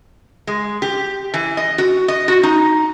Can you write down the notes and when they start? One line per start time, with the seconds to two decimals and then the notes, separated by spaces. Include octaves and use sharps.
0.47 G#3
0.82 G4
1.34 E3
1.57 D#5
1.78 F#4
2.08 D#5
2.28 F#4
2.43 D#4